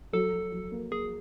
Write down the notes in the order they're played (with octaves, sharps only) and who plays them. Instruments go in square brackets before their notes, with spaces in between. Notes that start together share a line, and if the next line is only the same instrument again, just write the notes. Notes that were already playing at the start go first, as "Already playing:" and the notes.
[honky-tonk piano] F#3 [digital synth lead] A4
[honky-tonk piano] F#3
F#3
A#3
[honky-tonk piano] A#3 [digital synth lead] G#4